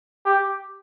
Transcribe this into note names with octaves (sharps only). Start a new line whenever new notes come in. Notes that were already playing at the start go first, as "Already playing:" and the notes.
G4